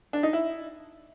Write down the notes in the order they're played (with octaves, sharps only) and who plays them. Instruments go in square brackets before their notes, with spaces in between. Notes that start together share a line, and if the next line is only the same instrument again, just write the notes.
[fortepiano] D4
D#4
E4